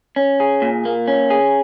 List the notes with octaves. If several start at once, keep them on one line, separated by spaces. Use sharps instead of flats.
C#4
G#4
A#2
A#3
C#4
G#4